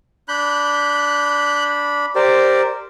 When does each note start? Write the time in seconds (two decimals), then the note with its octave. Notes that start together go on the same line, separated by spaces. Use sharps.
0.28 D4 B5 F#6 G6
2.16 G4 A#4 C5 D5